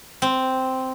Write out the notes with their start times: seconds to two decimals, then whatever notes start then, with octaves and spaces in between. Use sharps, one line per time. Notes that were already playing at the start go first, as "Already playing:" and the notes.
0.22 C4